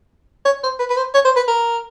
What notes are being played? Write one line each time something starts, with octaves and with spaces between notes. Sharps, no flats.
C#5
C5
B4
B4
C5
C#5
C5
B4
A#4